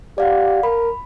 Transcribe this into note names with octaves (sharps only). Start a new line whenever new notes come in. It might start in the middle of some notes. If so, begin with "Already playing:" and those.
G4 D5 F5 F#5
A#4 B5